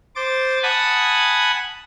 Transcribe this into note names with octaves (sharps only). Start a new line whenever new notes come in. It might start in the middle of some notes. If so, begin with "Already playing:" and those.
C5 D6 A6
F#5 G#5 A5 B5 D#6